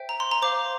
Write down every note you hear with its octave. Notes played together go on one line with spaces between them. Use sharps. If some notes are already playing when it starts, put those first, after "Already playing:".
Already playing: C5 E5 G5
A#5
C6
A#5
C5 F5 D6